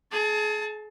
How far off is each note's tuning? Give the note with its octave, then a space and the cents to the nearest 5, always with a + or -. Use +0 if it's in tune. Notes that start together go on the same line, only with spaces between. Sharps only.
G#4 +35 A5 +10